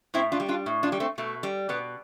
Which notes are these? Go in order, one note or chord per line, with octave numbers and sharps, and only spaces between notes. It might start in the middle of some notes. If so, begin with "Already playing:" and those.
A2 C4 E4
D4 F4
G3
D4 F4
A2
D4 F4
G3
A3 C4
B2 A3
G3
B2 B3